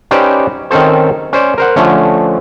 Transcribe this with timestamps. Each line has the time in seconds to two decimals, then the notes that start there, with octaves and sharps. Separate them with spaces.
0.11 C#4 D#4 G4 B4 C5 D5
0.71 D#3 C4 C#4 A4 C5
1.33 C#4 C5 D5
1.58 A#4 C5 F#5
1.76 D3 F3 A3 C#4